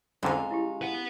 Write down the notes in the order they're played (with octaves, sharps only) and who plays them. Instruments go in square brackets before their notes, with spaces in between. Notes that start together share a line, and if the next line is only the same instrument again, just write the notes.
[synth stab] C2 F2 D3 [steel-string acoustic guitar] G#3 F5 [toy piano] C#4 A#5 C#6
[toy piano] E4 F4 G4
[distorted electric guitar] B4 F#5